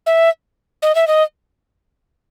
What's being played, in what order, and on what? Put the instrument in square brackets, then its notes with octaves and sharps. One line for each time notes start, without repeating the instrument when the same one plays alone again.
[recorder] E5
D#5
E5
D#5